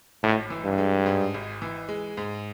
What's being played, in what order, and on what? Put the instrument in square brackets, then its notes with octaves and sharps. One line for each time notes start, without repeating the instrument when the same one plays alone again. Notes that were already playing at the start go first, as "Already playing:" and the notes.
[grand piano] G#1 [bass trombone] A2
[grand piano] E3
[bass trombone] G2
[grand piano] G#3
G#2
G#1
E3
G#3
G#2